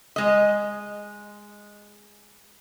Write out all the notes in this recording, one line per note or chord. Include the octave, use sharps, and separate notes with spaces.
G#3 D#5